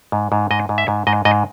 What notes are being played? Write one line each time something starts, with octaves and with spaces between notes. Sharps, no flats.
G#2
G#2
G#2 D#5
G#2
E5
G#2
G#2 D#5
G#2 D#5